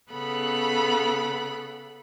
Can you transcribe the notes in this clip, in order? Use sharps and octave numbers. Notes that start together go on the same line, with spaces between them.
C#3 B3 A4 B5 F#6